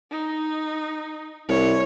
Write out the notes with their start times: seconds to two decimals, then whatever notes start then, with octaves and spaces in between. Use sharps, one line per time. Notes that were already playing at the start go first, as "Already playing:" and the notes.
0.11 D#4
1.49 C2 C#5